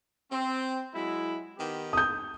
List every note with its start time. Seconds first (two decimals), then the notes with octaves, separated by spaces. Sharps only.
0.32 C4
0.94 F#3 G#3 E4
1.58 D#3 B3 G4
1.93 D#6 G6